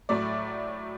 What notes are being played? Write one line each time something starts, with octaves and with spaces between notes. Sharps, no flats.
A2 F#3 A3 D5